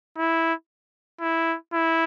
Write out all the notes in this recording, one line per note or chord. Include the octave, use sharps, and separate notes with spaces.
E4
E4
E4